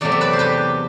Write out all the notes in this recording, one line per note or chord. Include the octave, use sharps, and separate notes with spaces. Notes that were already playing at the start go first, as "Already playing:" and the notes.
E2 C3 F#3 A3 C4 D5
E5
B4 D5
C5
G4 B4